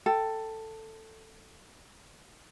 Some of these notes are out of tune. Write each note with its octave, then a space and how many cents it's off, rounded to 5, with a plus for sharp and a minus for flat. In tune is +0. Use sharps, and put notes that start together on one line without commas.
A4 +10 G5 -5